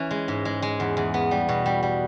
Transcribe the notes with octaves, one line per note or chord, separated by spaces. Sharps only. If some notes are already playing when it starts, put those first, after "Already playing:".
Already playing: E3 C#4
G#3
G#2
G#3
G#3
E2
E2
B3
G3
B2
G3
G3